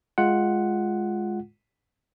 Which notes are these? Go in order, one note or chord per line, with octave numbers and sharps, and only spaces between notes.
G#3 F4 F#5